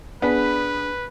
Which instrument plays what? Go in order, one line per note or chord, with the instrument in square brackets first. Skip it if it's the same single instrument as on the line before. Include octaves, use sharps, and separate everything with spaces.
[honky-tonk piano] B3 [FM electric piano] D4 G#4 B6 [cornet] B4